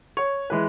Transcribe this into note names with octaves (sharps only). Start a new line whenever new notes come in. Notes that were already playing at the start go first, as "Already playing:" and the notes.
C#5
E3 G#3 B4